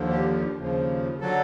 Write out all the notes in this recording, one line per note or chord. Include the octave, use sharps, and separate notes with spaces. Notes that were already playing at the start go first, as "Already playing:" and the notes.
Already playing: D#2 D3 F3
G4
D#2 C#3 F3
D3 F#3 A4